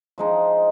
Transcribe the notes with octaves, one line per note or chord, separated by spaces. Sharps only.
F3 G#3 D#4